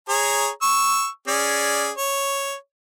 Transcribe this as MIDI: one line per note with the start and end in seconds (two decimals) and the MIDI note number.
0.09 0.49 68
0.09 0.49 73
0.09 0.49 82
0.62 1.07 85
0.62 1.07 88
1.28 1.90 61
1.28 1.90 68
1.28 1.90 74
1.97 2.54 73